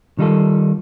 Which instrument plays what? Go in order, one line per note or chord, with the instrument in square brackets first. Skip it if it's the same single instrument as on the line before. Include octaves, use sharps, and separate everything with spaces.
[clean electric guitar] D#3 G3 D#4 F4 G#4 A4